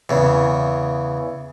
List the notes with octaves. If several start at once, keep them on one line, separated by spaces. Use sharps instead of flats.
E2 C#3